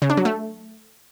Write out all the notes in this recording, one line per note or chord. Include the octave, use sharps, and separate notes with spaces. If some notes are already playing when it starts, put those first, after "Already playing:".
C#3
D4
F#3
A3